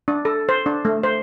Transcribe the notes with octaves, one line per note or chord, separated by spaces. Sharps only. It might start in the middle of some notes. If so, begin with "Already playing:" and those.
D4
A4
C5
D4
A3
C5